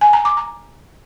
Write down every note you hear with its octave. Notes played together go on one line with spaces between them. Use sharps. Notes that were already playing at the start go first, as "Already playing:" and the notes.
G#5
A#5
D6
A#5